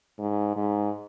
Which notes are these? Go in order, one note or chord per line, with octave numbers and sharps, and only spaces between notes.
G#2
G#2